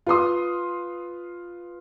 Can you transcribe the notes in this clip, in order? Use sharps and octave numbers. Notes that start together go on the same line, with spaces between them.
F4 B4 C6 D#6